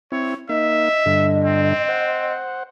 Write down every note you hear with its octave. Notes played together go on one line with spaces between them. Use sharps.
C4 E4 C#5
A#3 D#4 D#5 E5
G2 D3
C4
C5 F#5